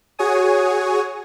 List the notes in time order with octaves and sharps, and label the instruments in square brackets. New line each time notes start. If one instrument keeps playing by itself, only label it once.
[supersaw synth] F#4 G#4 C#5 G#5 D#6